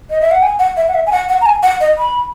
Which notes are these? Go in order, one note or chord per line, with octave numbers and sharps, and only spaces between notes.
D#5
E5
F#5
G#5
F#5
E5
F#5
E5
G#5
F#5
F#5
A#5
G#5
F#5
D#5
B5